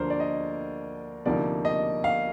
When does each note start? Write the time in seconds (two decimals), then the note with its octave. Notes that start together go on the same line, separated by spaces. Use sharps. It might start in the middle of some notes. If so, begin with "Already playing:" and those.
Already playing: D2 D3 F3 A#3 D4 A#4 C5
0.10 D5
0.20 D#5
1.26 D2 C3 F3 A#3 D#4 D5
1.65 D#5
2.04 F5